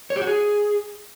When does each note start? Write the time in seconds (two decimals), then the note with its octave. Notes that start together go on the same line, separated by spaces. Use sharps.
0.10 C#5
0.16 G4
0.22 F#4
0.27 G#4